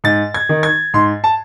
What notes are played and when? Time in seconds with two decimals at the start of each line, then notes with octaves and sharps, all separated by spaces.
0.04 G#2 A6
0.34 G#6
0.49 D#3
0.63 G#6
0.94 G#2 C6
1.24 A5